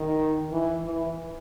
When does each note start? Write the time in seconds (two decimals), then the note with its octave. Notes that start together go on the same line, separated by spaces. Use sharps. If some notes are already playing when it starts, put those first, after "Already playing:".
Already playing: D#3
0.52 E3
0.85 E3